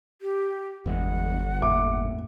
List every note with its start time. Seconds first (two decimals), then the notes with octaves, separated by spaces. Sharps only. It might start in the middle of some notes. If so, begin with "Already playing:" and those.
0.22 G4
0.86 G1 E2 E3 G#3 F#5
1.62 E2 A2 A#3 E5 D6